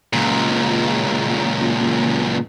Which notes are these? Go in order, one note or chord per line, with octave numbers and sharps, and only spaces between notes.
C#2 A#2